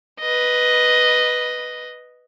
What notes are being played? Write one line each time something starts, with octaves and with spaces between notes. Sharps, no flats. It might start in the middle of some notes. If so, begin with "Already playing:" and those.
B4 D#5